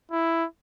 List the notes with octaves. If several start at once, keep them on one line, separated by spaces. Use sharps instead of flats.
E4